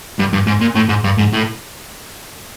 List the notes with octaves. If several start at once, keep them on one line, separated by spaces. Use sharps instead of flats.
G2
G2
G#2
A#2
A2
G#2
G2
G#2
A2